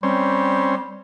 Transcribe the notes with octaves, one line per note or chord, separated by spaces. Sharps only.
G3 C4 C#4